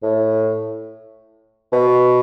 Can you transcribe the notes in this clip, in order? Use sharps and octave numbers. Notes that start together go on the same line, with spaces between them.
A2
B2